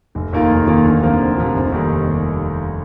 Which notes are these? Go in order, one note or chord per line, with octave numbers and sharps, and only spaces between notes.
F1
D#2 D#3 A#3 F4
F1
D#2 D#3 A#3 F4
D2
C3 F3 A#3 F4
D2
C3 F3 A#3 F4
F1
D#2 D#3 G3